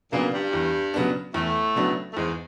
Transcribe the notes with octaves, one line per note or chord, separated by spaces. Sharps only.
A#2 C#3 F#3 A#3 B3 D4
G2 G3
E2
C#3 F#3 B3 D4
E2 A2 A3
C#3 F#3 B3 D4
A3
E2 G#2 G#3